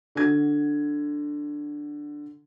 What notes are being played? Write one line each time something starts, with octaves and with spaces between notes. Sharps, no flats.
D3 F#4 G#6